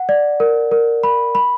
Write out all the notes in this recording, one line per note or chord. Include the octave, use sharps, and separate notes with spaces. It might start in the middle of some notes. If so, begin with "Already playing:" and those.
Already playing: F#5
D5
A#4
A#4
B5
B5